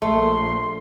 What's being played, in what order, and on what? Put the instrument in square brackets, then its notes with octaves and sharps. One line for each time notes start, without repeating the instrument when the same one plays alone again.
[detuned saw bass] A#1 [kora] A3 [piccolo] C6